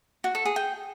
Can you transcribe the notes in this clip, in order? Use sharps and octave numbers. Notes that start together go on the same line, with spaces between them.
F#4
A4
G#4
G5